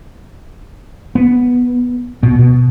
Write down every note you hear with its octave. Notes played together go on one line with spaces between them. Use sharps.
B3
B2
B2